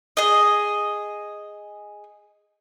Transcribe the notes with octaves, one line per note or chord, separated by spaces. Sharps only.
G#4 D#5